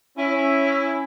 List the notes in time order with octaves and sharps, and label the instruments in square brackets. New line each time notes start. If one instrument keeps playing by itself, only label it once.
[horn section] C#4 E4